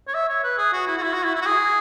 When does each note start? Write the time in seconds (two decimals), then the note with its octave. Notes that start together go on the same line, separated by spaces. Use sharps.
0.08 C#5
0.14 E5
0.29 C#5
0.44 B4
0.58 G#4
0.73 F#4
0.88 E4
0.98 F#4
1.03 E4
1.13 F#4
1.24 E4
1.35 E4
1.41 F#4
1.46 G#4